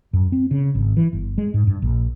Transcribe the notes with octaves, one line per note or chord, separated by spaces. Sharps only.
F#2
C4
C#3
G#1
E3
G1
G#3
G#2
G2
A#1